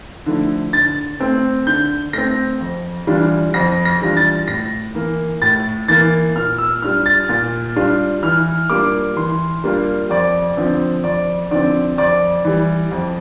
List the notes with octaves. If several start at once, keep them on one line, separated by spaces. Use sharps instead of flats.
D3 F3 A3 E4
D3 A6
A3 C4
D3 G6
A3 C4 A#6
F2
E3 G3 D4 F4
F2 A#6
A#6
E3 G3 D4 F4
A6
A2 A#6
E3 A#3
A2 A6
E3 A#3 A6
A#2 F6
E6
G3 D4 F4 F6
A6
A#2 A6
G3 D4 F4
E3 F6
G3 A#3 D4 F4 D6
E3 C6
G3 A#3 D4 F4
F2 D5
D3 F3 C4
F2 D5
D3 F3 C4 D5
F2 D5
E3 G3
F2